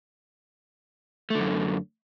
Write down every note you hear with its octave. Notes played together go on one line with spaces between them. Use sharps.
F#2 D3 A3